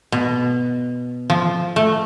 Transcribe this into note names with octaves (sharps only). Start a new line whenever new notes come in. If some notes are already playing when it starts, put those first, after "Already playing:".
B2
F3
A3